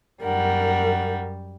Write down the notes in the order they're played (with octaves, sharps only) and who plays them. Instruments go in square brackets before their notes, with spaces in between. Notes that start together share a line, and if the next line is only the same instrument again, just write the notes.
[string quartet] F#2 G3 [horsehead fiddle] A#4 F#5